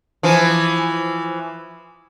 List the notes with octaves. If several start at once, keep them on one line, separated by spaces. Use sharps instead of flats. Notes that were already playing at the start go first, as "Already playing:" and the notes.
E3 F3